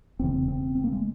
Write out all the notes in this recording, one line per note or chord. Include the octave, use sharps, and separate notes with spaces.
E1 E2 C#3 C4
C4
C4
A#3
G#3